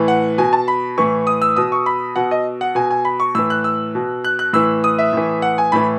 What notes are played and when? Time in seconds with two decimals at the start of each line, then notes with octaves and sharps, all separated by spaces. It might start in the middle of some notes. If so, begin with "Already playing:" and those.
Already playing: A2 E3
0.08 F#5
0.38 B2 G#5
0.53 A5
0.68 B5
0.98 A2 E3 C#6
1.27 D#6
1.42 E6
1.56 B2 D#6
1.72 C#6
1.86 B5
2.16 B2 F#5
2.31 D#5
2.61 F#5
2.75 B2 G#5
2.90 G#5
3.05 B5
3.20 C#6
3.35 A2 E3 E6
3.50 F#6
3.64 E6
3.95 B2
4.25 F#6
4.39 F#6
4.53 A2 E3 E6
4.84 D#6
4.99 E5
5.13 A2 E3
5.42 F#5
5.58 G#5
5.72 A2 E3 B5